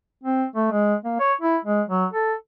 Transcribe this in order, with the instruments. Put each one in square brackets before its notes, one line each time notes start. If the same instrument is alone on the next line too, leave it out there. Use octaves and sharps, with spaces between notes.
[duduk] C4
A3
G#3
A#3
C#5
E4
G#3
F#3
A4